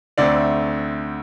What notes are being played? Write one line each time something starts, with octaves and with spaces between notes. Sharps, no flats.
D2 D3 A3 C4 D5